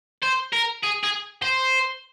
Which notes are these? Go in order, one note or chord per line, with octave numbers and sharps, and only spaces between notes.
C5
A#4
G#4
G#4
C5